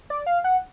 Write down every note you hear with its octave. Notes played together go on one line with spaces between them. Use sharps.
D5
F5
F#5